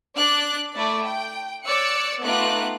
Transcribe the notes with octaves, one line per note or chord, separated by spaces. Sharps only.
D4 D5 F#6
A3 E4 D5
G5
C#5 D5 E6 F#6 C#7
A3 B3 D#4 F4 D6 F#6